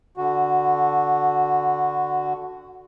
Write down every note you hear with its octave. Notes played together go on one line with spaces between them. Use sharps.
D3 F#4